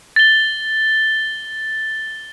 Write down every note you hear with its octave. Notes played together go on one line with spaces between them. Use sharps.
A6 G7